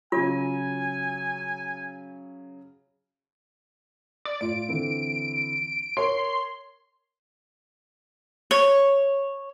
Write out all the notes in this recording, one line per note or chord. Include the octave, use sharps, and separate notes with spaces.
C#3 F#3 F4 G#5
D5
A2 F4 D7
D3 E3 C4
A#4 C#5 C6
C#5